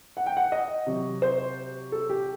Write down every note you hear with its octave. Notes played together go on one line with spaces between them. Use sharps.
F#5
G5
F#5
D#5
C3 F#3
C5
A4
G4